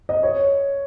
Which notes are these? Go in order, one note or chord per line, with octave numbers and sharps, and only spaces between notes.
D#5
C#5